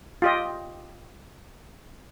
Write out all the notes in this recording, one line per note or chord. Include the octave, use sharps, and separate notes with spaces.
F4 G4 D#5